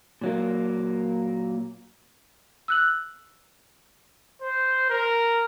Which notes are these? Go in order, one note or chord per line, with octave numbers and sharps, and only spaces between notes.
A#2 F#3 A#3
E6 F#6 F#7
C5
A#4